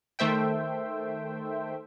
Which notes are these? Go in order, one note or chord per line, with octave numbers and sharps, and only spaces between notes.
D#3 A3 C5 E5 G5